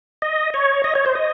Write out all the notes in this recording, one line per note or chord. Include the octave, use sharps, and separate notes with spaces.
D#5
C#5
D#5
C#5
C5
D#5